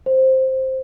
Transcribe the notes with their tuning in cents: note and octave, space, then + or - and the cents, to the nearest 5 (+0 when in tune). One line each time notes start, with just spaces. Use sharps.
C5 +5